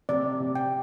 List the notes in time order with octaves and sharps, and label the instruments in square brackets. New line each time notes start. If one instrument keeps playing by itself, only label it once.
[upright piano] C3 [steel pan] D5
[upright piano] C3
[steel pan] G5